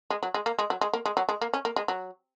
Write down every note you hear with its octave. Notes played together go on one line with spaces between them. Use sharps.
G#3
F#3
G#3
A#3
G#3
F#3
G#3
A#3
G#3
F#3
G#3
A#3
C#4
A#3
G#3
F#3